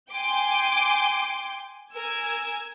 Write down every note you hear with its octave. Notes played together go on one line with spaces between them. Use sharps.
G5 G#5 C6 D6 G6
A#4 G#5 E6 G#6